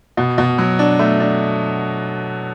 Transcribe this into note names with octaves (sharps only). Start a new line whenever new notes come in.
B2
B2
F#3
D4
A3
D4